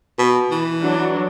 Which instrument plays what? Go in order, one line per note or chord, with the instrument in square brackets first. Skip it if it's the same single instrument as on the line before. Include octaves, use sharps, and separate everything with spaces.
[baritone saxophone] B2
E3
[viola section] F#3 D4